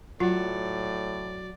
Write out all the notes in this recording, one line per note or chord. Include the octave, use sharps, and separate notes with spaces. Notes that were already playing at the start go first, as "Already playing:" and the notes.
A2 F#3 F4 D5